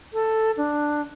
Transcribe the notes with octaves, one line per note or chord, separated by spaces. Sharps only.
A4
D4